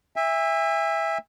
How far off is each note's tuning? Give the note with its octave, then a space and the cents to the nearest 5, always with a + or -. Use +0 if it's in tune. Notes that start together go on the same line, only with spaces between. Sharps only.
E5 +0 G#5 -40